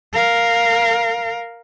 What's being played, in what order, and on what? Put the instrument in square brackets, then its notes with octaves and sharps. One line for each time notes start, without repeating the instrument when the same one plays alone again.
[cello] A#4 F5